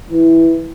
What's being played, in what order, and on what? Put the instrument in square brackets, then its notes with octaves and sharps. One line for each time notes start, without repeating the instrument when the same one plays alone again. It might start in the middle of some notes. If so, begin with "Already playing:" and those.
[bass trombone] E3